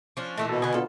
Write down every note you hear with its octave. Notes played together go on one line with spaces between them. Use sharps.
F3 C#4 D4
A#2 E3 A3 D#4
B2 A4
D3 B4 D#5 G#5
D3 B3 F4 A4